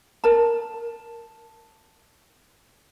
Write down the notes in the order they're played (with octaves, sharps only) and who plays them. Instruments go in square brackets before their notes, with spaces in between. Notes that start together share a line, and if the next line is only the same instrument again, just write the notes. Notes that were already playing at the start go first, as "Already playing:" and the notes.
[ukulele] A#4 A5